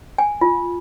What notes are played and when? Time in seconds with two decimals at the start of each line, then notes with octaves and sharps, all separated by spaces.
0.18 G#5
0.41 F4